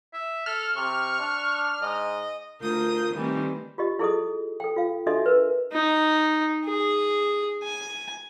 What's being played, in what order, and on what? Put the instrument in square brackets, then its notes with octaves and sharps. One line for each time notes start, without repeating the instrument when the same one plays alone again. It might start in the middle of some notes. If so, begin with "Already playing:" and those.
[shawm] E5
[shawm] A4 [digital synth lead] F6
[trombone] C3 [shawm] C#6
[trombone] D4
[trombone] G#2 [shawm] D#5
[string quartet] D2 F4 A#4 D#6 G6
D#3 E3 G3 A3 C4
[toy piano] F4 G4 D#5
E4 G#4 A4 D#5 D#6
A4 G5
F4 F5
D4 F#4 A4 D#5 E5
A#4 B4
[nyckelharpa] D#4
G#4
G#5